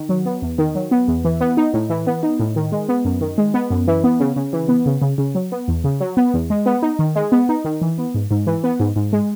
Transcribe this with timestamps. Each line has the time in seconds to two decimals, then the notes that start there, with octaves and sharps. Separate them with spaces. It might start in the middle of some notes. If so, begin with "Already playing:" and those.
Already playing: D#3
0.09 F#3
0.25 B3
0.42 E2
0.58 D#3
0.75 F#3
0.91 B3
1.08 E2
1.25 E3
1.41 B3
1.57 D#4
1.74 A2
1.90 E3
2.07 B3
2.23 D#4
2.40 A2
2.56 D#3
2.72 G#3
2.89 B3
3.05 F#2
3.21 D#3
3.38 G#3
3.54 B3
3.71 F#2
3.87 E3
4.04 B3
4.20 C#3
4.36 C#3
4.53 E3
4.69 B3
4.86 C#3
5.02 C#3
5.18 C#3
5.35 F#3
5.52 B3
5.68 E2
5.84 C#3
6.00 F#3
6.17 B3
6.34 E2
6.50 G#3
6.66 B3
6.82 D#4
6.99 D#3
7.16 G#3
7.32 B3
7.49 D#4
7.65 D#3
7.81 E3
7.98 B3
8.14 G#2
8.31 G#2
8.47 E3
8.64 B3
8.80 G#2
8.96 G#2
9.13 G#3